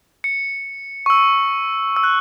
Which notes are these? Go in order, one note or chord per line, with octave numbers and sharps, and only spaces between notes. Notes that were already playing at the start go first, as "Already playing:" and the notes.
C#7
C#6
E6
E6
F#6